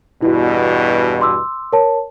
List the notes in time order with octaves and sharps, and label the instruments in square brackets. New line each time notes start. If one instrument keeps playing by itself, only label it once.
[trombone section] E2 G2 B2 [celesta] E4 F#4
[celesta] C6 D6 E6
A#4 C#5 A5